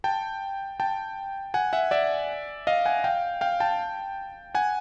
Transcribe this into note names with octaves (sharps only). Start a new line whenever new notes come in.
G5 A5
G5 A5
F#5 G#5
E5 F#5
D5 E5
D#5 F5
F#5 G#5
F5 G5
F5 G5
G5 A5
F#5 G#5